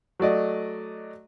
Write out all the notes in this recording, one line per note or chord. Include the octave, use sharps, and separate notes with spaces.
F#3 A3 D5 D#5